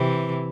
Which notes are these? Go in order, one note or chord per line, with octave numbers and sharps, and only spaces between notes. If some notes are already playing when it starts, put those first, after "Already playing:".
Already playing: C3 E3